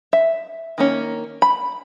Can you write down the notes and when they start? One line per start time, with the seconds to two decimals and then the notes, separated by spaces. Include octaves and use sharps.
0.13 E5
0.78 D#3 A#3 C#4
1.42 B5